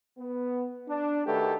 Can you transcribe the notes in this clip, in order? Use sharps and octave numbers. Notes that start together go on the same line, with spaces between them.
B3
D4
D#3 A3 F#4 G4 A4 B4